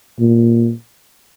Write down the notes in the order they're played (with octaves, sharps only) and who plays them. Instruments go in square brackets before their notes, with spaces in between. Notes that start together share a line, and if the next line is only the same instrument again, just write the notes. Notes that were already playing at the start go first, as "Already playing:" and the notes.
[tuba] A#2